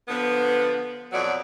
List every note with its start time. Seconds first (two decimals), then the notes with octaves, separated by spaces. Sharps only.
0.08 D3 F3 B3
1.13 F2 B2 F#3 D5